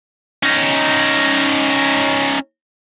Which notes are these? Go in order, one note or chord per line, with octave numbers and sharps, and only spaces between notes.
C#4 D#4